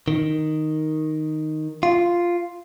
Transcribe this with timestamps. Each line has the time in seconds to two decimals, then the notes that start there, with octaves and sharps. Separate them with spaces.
0.08 D#3
1.83 F4